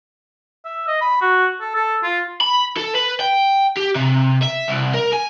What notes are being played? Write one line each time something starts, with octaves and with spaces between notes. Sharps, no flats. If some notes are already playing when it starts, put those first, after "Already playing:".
E5
D#5
B5
F#4
A4
A4
F4
B5
A4
B4
G5
G4
C3
E5
C2
A#4
G#5